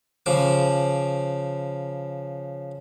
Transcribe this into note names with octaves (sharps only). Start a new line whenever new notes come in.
C#3 F3 D6